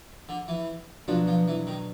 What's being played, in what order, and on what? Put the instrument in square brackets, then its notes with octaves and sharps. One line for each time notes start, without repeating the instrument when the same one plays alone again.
[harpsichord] D3
E3
[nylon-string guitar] B2 F#3 B3 D4 F#4 [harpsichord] F3
[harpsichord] F3
E3
D#3